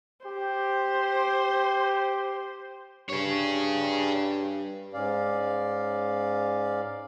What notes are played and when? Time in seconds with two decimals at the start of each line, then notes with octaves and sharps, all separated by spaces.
0.26 G4 C5
3.09 G2 G#4 C#5
4.94 G#2 C#4 D5 F5